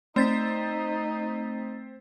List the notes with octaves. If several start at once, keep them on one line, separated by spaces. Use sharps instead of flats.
A3 C4 D#4 A6 B6